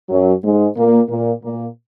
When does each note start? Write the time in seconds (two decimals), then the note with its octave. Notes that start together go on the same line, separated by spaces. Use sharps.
0.10 F#2 F#3
0.44 G#2 G#3
0.76 A#2 A#3
1.09 A#2 A#3
1.43 A#2 A#3